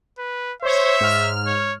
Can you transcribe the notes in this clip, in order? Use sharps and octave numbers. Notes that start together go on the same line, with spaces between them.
B4
C5 C#5 E5
G#2 F6
C#5